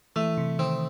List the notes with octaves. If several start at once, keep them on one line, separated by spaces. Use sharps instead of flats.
E3 A3
C3
D#3 C4